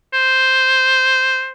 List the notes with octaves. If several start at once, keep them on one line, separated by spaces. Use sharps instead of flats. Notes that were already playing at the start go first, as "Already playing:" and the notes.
C5